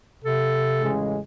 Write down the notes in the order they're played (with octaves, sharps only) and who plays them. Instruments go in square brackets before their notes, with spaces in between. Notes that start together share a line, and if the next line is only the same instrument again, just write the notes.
[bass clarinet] C3 [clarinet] A4
[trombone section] A1 C#3 G#3